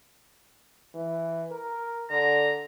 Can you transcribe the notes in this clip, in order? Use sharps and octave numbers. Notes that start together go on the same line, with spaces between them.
E3
A#4
D3 A#5